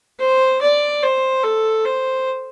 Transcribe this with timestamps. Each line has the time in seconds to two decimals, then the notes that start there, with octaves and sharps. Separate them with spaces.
0.19 C5
0.61 D5
1.02 C5
1.43 A4
1.85 C5